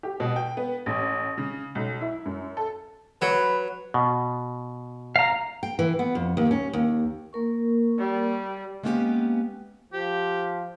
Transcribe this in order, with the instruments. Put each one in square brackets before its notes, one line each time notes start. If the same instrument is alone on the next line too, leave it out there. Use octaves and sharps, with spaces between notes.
[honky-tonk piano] G4
B2
G5
B3
A1
C#3
B1
E4
F#2
A4
[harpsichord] F#3 [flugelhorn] B4
[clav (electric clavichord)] B2
[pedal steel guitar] F5 A#5
[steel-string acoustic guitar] G5
E3
B3
F2
D#2
C#4
D#2
[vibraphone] A#3 A#4 C#6
[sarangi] G3
[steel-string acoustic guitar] G#3 A#3 B3 C#4 F#4 G4
[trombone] F3 [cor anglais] G4